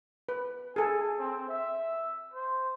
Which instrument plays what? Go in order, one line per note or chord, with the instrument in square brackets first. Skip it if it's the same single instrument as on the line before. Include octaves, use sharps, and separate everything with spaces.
[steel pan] B4
[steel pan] G#4 A4 [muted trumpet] G#5
[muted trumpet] C4
E5
C5